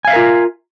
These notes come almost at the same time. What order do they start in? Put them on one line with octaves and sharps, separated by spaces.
G#5 F5 E5 A#4 F4